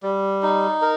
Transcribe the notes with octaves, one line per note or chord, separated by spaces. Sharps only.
G3
D#4
A#4